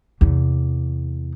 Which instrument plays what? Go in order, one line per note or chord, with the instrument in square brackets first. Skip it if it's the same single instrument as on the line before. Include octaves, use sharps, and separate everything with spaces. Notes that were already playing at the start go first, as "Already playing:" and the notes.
[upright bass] E2 C3